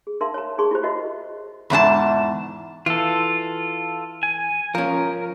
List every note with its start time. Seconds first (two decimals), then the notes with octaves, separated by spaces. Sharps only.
0.07 G#4
0.21 D#4 A#4 E5 F5 C6
0.34 C#5 A#5
0.58 D#4 G#4 C6 C#6
0.71 E4 F4 G4 C5
0.83 F#4 A#4 C#5 D#5 E5 F#5
1.70 E2 G#2 D4 A5
2.86 E3 F4 A4
4.23 G#5
4.75 F3 C#4 A#4